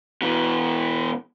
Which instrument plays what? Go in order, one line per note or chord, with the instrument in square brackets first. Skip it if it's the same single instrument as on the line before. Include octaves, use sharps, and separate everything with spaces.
[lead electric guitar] B2 E3